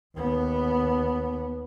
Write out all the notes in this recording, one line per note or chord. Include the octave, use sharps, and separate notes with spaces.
D#2 B3